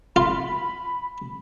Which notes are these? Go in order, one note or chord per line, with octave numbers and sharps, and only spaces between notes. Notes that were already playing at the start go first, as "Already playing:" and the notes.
F4 B5